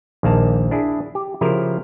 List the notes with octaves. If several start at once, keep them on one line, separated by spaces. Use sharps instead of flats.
A#1 D#2 A#3 A5
D4 E4 G#4
G4
C#3 F3 E4 G4 A#4 C5